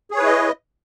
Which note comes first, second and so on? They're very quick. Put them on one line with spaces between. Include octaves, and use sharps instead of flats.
G#4 C#5 B4 E4 D#5